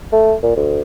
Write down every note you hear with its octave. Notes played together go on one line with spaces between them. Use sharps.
A3
A#2
D2